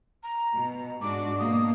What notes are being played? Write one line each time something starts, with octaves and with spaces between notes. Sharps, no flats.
A#5
B2
G#2 D4 F#4 D6
B2 A#3 D#6